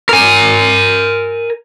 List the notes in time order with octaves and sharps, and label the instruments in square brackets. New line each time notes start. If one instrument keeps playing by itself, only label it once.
[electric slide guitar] A#4 G#5